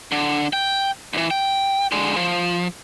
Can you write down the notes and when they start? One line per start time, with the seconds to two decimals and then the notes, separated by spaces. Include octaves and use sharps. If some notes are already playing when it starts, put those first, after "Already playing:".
0.12 D3
0.53 G5
1.13 D#2 E3
1.31 G5
1.92 D3 G#3
2.16 F3